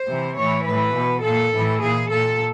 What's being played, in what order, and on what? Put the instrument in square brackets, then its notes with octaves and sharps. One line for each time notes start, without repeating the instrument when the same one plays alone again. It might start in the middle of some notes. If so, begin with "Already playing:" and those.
Already playing: [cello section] C5
C3 E3
A2 E3 C#5
A2 E3 B4
B2
A#2 A4
A2 E3
A#2 G#4
A#2 A4